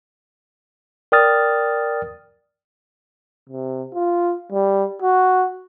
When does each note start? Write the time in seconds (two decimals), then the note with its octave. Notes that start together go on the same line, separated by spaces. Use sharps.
1.12 A#4 D5 G5 D#6 F6 A6
3.49 C3
3.94 F4
4.52 G3
5.02 F#4